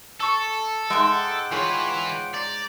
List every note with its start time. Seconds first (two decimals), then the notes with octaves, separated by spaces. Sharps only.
0.20 A4 C#6 E6
0.90 G#2 G#3 E5 F#5 G5 D6
1.52 E3 F4 G#4 B4 C#5
2.34 C5 D5 A#5 D6